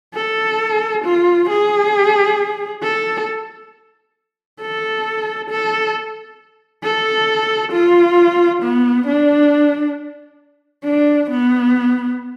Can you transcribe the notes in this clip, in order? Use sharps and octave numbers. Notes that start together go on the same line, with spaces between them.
A4
F4
G#4
A4
A4
A4
A4
F4
B3
D4
D4
B3